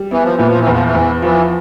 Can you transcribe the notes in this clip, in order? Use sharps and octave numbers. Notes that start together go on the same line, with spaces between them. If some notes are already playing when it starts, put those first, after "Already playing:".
Already playing: G3
E3 B3
F3
A#2 E3
F3
E3
E2 F3
E3
E2
E3 F3